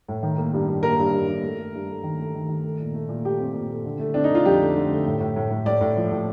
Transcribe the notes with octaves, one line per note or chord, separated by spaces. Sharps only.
A2
D#3
A#3
G2
G2
A#3 A#4
G2
G2
G2
A3
A3
G2
A3
D#3
A3
D#3
D#3
A3
A#2
A3
A#2
A3 G4
C4
A#2
A3
D3
A3
C4 D4
D#4
D3 F4
F2 G4
A3
D3
A3
A2
A2
A2
A2
A2 D5
A2
F3
A2